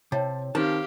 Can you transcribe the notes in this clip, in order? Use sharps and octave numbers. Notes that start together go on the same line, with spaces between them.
C3 E4 C#5 G5 A5
D#3 C4 G4 F5 A5